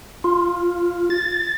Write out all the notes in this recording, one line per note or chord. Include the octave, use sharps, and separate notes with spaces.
F4
A6